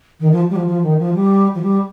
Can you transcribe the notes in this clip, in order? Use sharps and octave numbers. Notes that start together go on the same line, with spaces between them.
D#3
F3
G3
F3
F3
D#3
F3
G3
F3
G3